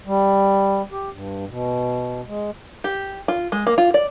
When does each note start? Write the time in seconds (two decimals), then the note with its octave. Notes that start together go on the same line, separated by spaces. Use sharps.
0.06 G3
0.92 G4
1.13 G2
1.48 B2
2.27 G#3
2.84 G4
3.28 F4
3.52 G#3
3.67 A#3
3.78 F4
3.94 D5